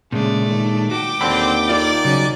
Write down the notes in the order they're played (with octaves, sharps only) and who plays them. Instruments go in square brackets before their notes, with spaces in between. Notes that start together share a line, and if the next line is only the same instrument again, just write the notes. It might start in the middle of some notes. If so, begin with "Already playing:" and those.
[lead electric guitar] A#2 G#3 [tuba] C#3 [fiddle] A3 D5
[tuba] D#3
[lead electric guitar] F#4 [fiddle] G5 D6
[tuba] D#2 [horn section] D3 C4 [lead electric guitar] D5 B5
[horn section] D#3 D5 [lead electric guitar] F4 A4
[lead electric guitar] C#3 [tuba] F#3 [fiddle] C#4 F#6